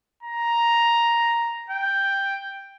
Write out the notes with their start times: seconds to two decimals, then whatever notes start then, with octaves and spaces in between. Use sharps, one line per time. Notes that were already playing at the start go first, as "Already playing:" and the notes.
0.23 A#5
1.70 G5